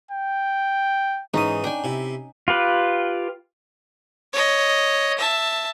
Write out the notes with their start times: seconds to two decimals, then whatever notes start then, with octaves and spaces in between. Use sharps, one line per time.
0.11 G5
1.34 G#2 E3 C#4 D#4 D#6
1.64 D4 G5 G#5
1.84 C3 E4
2.48 F4 G4 B4
4.33 C#5 D#5
5.18 E5 A5